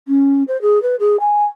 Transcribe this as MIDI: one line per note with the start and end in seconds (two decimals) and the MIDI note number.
0.08 0.43 61
0.48 0.60 72
0.62 0.82 68
0.82 0.96 71
1.00 1.16 68
1.20 1.45 80